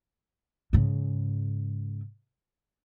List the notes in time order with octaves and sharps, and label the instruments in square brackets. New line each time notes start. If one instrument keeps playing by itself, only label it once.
[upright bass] G#2 C#3